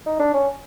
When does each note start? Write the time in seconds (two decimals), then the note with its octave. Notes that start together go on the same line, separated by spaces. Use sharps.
0.06 D#4
0.19 D4
0.34 C#4